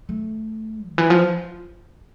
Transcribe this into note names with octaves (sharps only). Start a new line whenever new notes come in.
A3
D#3
E3
F3